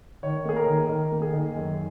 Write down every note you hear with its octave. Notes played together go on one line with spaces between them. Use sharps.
D#3 C#5
A#3 G#4
A#4
D#3
D#3 A#4
A#3
G#4
D#3
F#2